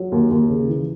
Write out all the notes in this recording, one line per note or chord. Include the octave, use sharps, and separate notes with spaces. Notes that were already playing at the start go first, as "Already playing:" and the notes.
Already playing: F#3
D#2
D#2
C#3
E3